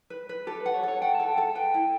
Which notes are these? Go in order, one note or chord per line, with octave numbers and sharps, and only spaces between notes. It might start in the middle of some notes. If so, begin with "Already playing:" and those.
B4
B4
G4 A4
B4
F#5
C#5
A4
C#5
F#5 G5
A5
A4
G5
A4 F#5
B4 G5
E4